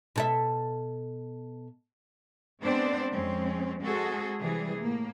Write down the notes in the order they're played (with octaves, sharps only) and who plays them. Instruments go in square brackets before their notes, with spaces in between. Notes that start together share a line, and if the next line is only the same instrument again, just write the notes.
[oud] B2 A4 E5
[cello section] G#3 B3 C4 D4 C5 D5
F2 G#3 C4 C#4
G#3 C4 F#4 G#4 A4
C3 E3 G3 G#4
A2 A#3